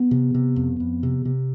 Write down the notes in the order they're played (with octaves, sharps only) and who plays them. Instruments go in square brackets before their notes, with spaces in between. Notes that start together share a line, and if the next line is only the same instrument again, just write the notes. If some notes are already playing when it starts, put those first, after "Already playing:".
Already playing: [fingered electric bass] B3
C3
C3
F2
F2
C3
C3